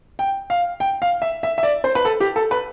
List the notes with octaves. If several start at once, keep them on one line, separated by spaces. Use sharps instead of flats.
G5
F5
G5
F5
E5
E5
E5
D5
C5
B4
A4
G4
A4
B4